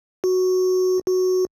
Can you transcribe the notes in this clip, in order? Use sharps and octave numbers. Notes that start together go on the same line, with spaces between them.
F#4
F#4